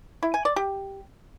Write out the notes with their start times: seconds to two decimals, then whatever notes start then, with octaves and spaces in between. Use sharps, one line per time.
0.23 E4
0.34 G#5
0.45 D5
0.56 G4